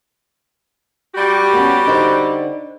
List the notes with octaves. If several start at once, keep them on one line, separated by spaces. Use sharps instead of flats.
G3 F#4 G4
B3 C#4
D3 D#4 C5